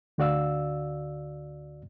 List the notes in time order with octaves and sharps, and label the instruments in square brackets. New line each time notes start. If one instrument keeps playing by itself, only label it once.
[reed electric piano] D2 D3 F#4 D5 F5 E6